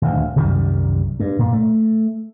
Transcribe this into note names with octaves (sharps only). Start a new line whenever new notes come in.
D#1 D2
C2 F#2 D#3 G3
G2
A#2
A3